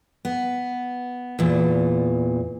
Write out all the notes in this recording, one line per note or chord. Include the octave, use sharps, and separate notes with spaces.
B3
E2 A#2